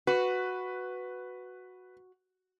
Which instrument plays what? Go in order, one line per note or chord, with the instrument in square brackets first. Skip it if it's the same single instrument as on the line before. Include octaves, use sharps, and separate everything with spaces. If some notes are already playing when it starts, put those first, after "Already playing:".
[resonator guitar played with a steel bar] F#4 [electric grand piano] B4